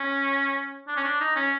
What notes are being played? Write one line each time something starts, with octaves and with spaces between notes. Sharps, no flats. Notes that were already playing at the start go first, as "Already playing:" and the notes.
Already playing: C#4
D4
C#4
D4
D#4
C#4